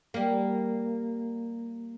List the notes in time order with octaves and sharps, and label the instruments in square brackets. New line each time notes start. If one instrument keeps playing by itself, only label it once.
[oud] G3 A#3